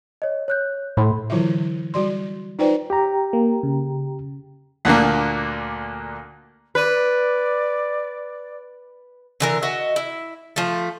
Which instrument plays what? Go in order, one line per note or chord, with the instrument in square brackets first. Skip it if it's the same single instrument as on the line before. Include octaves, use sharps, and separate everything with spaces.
[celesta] C#5 D#5
C#5 F#6 G6
[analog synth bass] A2 [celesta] B5 C6
[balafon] D3 E3 F#3 E4 F4 E5
G3 F#4 D5 C6
D#4 F4 B4 C5 D5 G5
[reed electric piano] G4 G5 A#5
[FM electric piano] A#3
C#3
[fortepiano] D2 A#2 D3 A#3
[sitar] B4 [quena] D5
[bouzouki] D3 E3 A#4
F#4 D#5 E5
E4
F3 A3